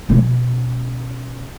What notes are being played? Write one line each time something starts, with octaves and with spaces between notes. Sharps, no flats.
B2 C#4